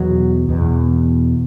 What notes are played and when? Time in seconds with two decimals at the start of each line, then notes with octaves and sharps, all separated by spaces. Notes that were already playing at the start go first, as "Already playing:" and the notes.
Already playing: E2 B2 F#3
0.49 E2 B2